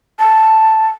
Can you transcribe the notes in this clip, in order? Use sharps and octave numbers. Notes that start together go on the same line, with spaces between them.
A5